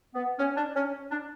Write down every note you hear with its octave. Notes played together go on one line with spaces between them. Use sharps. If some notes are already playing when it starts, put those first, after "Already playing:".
B3
C#4
D4
C#4
D4